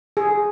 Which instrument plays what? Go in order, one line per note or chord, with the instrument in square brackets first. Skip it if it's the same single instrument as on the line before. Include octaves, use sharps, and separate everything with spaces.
[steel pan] G#4